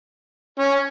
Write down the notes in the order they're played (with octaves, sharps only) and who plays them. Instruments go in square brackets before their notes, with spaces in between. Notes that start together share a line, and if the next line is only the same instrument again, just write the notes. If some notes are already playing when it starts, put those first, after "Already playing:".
[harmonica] C#4